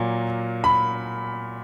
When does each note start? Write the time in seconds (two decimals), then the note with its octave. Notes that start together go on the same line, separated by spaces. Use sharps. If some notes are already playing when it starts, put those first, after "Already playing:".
Already playing: A#2 F#3 A#3
0.64 B5